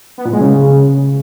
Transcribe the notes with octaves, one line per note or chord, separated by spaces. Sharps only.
B3
A#2
G#3
C#3